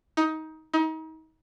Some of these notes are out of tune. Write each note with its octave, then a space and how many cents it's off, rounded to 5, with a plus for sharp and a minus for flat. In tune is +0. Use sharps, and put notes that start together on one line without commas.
D#4 +20
D#4 +35